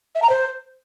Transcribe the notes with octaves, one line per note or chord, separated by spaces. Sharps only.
E5
A#5
C5